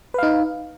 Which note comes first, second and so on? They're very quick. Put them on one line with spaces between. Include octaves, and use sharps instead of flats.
B4 F5 D#4